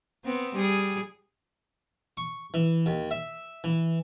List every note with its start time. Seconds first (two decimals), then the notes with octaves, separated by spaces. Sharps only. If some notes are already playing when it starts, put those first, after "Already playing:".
0.24 B3 C4
0.55 G3 G#4
2.17 C#6
2.54 E3
2.86 D#2
3.11 E5
3.64 E3